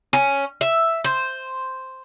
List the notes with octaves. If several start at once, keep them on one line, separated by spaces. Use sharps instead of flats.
C#4
E5
C5